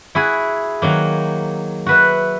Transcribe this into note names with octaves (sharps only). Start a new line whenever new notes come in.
E4 F#4 G#4
D#3 F#3 A#3
F#4 B4 E5